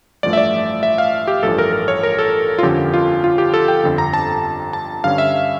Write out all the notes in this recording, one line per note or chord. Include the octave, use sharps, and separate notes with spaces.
A1 G2 F3 A3 D5
E5
D5
E5
F5
G4
A1 G2 F3 A4
A#4
A#4
C#5
A#4
A4
F4
G1 F2 D3 F3 C#4 G4
F4
F4
G4
A4
G5
G1 F2 D3
A#5
A5
A5
G2 D3 G3 C#4 F5
E5